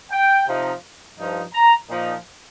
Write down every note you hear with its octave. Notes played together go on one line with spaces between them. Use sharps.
G5
C3 F3 D#4
G2 F3 D#4
A#5
A#2 F3 D#4